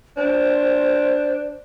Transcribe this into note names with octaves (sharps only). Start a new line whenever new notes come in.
D4 C5